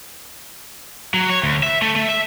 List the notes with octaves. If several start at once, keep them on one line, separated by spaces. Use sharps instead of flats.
F#3
C#5
D2
E5
A3
A3
E5